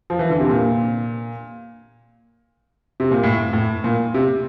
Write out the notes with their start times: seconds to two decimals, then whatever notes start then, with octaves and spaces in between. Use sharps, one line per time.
0.10 F3
0.19 E3
0.30 D3
0.40 C3
0.49 A#2
3.00 C3
3.11 A#2
3.23 A2
3.53 A2
3.84 A#2
4.14 C3